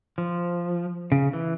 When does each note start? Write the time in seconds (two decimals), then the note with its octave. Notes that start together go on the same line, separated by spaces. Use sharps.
0.18 F3
1.12 C#3
1.33 E3